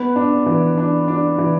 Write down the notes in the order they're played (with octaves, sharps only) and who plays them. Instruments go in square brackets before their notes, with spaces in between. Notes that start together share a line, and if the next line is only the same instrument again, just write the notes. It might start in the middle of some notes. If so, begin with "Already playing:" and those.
Already playing: [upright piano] B3
D4
E3
D4
D4
E3